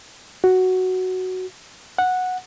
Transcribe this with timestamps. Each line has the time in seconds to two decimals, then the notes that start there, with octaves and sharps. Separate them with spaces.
0.44 F#4
1.98 F#5